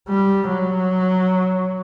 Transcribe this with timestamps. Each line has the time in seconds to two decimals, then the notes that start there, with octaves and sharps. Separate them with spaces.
0.09 G3
0.49 F#3